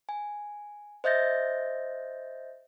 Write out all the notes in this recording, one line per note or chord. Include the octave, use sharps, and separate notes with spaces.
G#5
C5 D#5 E5 G6 A6 A#6